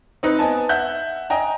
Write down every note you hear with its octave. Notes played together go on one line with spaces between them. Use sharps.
C4 D#4 B4
B3 D#5 G#5 A5
E5 F#5 F#6 G6
D#5 G5 G#5 A#5